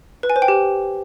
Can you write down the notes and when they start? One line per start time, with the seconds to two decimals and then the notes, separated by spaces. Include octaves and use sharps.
0.23 B4
0.30 G#5
0.36 C5
0.42 G5
0.48 G4